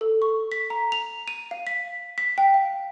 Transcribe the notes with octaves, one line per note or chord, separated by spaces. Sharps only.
A4
C#6
B6
A#5
F7
D#7
F5
B6
B6
G5
F5